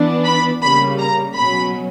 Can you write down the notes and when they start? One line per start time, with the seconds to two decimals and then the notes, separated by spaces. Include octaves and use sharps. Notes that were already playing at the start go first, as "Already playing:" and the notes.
Already playing: E3 B3 D4
0.25 B5
0.62 C#3 G3 A#3 B5
0.99 A#5
1.35 B2 F#3 C#4 B5